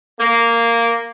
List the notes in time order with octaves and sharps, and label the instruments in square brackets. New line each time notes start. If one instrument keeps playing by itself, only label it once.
[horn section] A#3